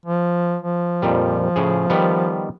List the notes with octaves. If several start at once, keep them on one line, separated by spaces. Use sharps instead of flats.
F3
F3
F2 A#2 G3
A2 C#3 G#4
D#3 G3 B3